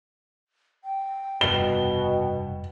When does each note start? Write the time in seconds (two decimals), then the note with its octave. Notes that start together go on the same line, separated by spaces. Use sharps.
0.84 G5
1.41 F1 G2 B2 G7